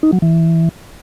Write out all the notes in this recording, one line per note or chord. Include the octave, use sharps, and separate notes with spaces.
D#4
F#3
E3